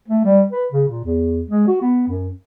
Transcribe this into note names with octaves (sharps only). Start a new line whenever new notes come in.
A3
G3
B4
C#3
A#2
E2
G#3
F#4
B3
F#2